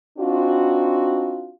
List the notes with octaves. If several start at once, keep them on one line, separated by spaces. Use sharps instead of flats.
C4 D4 D#4 F4 F#4